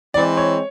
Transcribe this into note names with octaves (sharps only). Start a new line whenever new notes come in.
E3 G#3 C4 D5
C#5